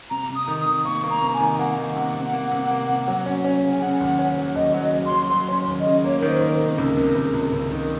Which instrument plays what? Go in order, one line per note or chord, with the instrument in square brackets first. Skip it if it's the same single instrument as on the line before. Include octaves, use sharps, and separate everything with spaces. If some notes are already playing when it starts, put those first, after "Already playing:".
[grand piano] C3 [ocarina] A#5
[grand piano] C3
[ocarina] D#6
[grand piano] D#3
[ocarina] D#6
[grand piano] D#3
[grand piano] A#3 [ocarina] C#6
[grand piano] A#3
[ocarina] A#5
[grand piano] C3
[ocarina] G#5
[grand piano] D#3
[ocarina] G#5
[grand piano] A#3 [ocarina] F#5
[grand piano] D#3
[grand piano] C3 [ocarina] F#5
[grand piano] C3
A#3
C3
A#3
C3
F#3
C#4
C#4
C#3
[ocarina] G#5
[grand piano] C#3 [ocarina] F#5
[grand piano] D#2
C#4
F#3
[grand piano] D#2 [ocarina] D#5
[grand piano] F#3
[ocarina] D#5
[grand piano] C#3
[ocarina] C6
[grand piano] F#3
[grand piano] F#3 [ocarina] C6
[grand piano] C#4
D#2
[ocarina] D#5
[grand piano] C#3
[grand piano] A#3 [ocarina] C#5
[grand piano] D#3 [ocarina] A#4
[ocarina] C5
[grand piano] D#3
[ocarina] A#4
[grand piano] C3
C#2
C3
C#2
C#2
C#2
D#3